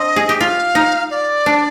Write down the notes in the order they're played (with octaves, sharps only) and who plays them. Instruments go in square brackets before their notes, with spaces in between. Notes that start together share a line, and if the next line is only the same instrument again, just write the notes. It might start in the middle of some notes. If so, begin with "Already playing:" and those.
Already playing: [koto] C4 D4 [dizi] D#5
[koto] G#4
G4
[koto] F4 [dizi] F5
[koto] D#4
[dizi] D5
[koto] D4